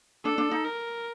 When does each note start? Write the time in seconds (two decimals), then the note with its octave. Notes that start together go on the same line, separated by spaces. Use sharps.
0.25 D4 A4
0.38 D4
0.51 D#4
0.65 A#4